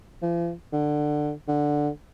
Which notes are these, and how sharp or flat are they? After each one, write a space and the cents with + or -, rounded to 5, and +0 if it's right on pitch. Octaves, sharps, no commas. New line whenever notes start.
F3 -45
D3 +20
D3 +5